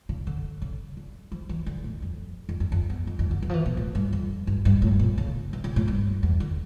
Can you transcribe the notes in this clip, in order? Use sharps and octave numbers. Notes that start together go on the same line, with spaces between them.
C#3
D3
C#3
D3
F3
E3
D3
A2
F2
F2
F2
F2
E2
F2
F2
D3
E3
F3
E3
A#2
A2
G2
F2
G2
G2
A2
A#2
C#3
E3
C#3
A2
G2
E2
D3